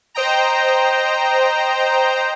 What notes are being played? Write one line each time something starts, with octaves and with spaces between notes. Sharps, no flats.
C5 D#5 G5 A#5